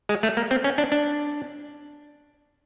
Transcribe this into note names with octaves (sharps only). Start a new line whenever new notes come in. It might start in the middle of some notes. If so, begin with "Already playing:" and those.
G#3
A3
A#3
C4
C#4
D4
D4